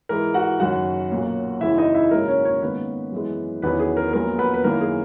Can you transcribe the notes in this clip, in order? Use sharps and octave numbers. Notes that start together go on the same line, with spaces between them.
G#2 E3 G#3 A#4
F#4 F#5
F#1 F#2 D#3 F#4 F#5
B1 A#2 A#3 C#4
F#1 F#2 C#3 E3 E4 E5
D#4 D#5
E4 E5
G#1 F#2 C#3 F#3 A#3 A#4
C#4 C#5
C#4 C#5
G#2 D#3 A#3 B3 C#4 B4
F#2 E3 G#3
E2 D#3 F#3 B3 C#4 E4 B4
G#4
A#4
A#1 A#2 F#3 B3 A#4
B3 B4
B4
F#2 D#3 A#3 E4 A#4
G#4